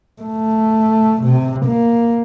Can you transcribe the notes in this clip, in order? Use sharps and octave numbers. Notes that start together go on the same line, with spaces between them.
A3
C3
A#3